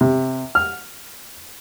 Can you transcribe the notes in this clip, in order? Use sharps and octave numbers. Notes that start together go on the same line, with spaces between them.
C3
F6